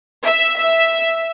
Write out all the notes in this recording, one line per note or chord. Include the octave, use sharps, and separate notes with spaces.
E5
E5